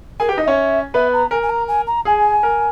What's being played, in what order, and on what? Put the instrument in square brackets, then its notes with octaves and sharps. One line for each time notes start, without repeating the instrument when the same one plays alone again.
[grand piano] G#4 G#5 [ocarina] A#4
[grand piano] G4 G5
[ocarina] B4
[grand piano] D#4 D#5
[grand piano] C#4 C#5 [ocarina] E5
[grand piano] B3 B4 [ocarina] E5
[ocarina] A#5
[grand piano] A#4 [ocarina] G#5
[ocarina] G#5
A#5
G#5
A#5
[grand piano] G#4 [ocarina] G#5
[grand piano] A#4